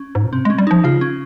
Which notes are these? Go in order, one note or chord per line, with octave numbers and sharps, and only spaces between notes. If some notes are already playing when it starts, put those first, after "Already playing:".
Already playing: C#4
G#2
A#2
C3 C4
G#3
C#4
G3
F3 D#4
C#3 F4
C#4